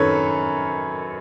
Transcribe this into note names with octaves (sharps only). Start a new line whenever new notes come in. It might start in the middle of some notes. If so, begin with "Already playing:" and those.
Already playing: F#2 D#3 A4 B4 C#5